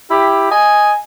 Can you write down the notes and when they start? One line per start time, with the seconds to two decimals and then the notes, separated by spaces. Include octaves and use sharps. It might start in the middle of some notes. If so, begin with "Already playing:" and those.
0.11 E4 G4
0.51 D#5 G#5